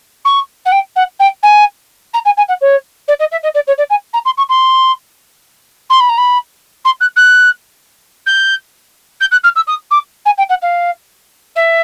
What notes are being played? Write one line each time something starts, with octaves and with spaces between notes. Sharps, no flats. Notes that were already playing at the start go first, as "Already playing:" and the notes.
C#6
F#5
G5
F#5
G5
G#5
A#5
G#5
G#5
F#5
C#5
D5
D#5
E5
D#5
D5
C#5
D5
G#5
A#5
C6
C#6
C6
C6
B5
A#5
B5
C6
F#6
F#6
G6
G6
F#6
F6
E6
D#6
D6
G#5
G5
F#5
F5
E5